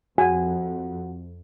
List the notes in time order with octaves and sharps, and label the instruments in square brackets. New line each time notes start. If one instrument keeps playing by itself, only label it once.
[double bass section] F2 [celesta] F#4 F#5 [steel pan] G#5